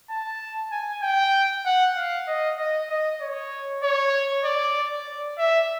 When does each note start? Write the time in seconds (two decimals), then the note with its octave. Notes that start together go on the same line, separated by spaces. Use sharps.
0.10 A5
0.72 G#5
1.02 G5
1.66 F#5
1.96 F5
2.28 D#5
2.58 D#5
2.90 D#5
3.21 C#5
3.83 C#5
4.45 D5
5.08 D5
5.38 E5